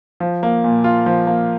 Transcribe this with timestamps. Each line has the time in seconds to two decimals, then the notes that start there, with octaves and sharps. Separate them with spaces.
0.20 F3
0.43 A#3
0.64 A#2
0.84 F4
1.06 F3
1.27 A#3